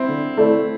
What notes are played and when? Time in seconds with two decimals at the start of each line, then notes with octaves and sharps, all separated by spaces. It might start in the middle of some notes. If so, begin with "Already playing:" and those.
Already playing: C4 E4
0.08 D3
0.37 A3 E4 A4 D5